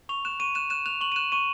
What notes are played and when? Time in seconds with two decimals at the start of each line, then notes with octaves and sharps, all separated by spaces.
0.09 C#6 F7
0.25 F#6 E7
0.40 C#6 D#7
0.55 F#6 E7
0.70 F#6 E7
0.86 F#6 F7
1.01 C#6 F#7
1.12 D#7
1.16 F#6 E7
1.32 C#6 D#7